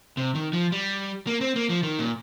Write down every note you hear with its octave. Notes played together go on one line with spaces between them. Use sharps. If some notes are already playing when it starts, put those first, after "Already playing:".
C3
D#3
F3
G3
A#3
C4
A#3
F3
D#3
A#2